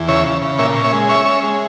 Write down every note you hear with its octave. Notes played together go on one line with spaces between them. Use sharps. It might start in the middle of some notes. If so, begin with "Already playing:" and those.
Already playing: E2
C#3 C#5 E5
C#3
C#3
A#2 C#5 E5
C#4
C#5 E5
G#3
C#4 C#5 E5
C#4
G#3